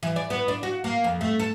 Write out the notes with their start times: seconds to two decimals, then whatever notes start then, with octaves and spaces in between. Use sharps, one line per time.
0.03 E3
0.16 D5
0.30 B3
0.48 D4
0.63 F#4
0.84 A#3
1.04 F2
1.21 A3
1.40 A4